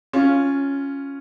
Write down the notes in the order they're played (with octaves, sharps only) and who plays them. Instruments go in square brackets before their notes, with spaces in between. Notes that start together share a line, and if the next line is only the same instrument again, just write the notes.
[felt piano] C#4 F4